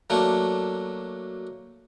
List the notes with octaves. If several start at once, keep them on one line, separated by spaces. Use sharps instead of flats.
F#3 A3 A#3 D4